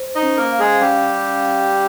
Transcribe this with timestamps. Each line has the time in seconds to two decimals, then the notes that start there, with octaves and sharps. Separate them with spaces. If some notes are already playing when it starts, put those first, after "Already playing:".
Already playing: C5
0.15 D#4 D#5
0.22 C#4
0.37 A#3 A#4
0.52 F5
0.59 G#3 G#4
0.81 G3 C#4 G4